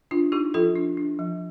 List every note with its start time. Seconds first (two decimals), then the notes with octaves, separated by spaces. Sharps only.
0.11 D4 F4
0.32 D4 D#4 G4
0.54 F3 F4 A4
0.76 D4
0.97 D4
1.19 F3